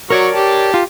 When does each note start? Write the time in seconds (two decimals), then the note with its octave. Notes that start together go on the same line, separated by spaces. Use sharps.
0.10 F#3 A#4 C#5 D5 C#6
0.34 G4 A5
0.74 F4